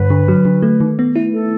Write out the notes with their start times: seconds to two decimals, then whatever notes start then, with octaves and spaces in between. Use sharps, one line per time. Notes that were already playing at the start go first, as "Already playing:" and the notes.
Already playing: G2 D3 B4
0.10 D3
0.28 F#3
0.45 D3
0.62 A3
0.80 D#3
0.99 B3
1.16 E4
1.33 A4